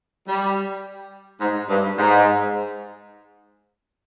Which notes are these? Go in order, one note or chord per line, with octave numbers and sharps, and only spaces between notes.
G3
G#2
G2
G#2